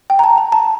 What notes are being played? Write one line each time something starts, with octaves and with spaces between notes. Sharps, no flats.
G5
A#5
A5
A#5
A5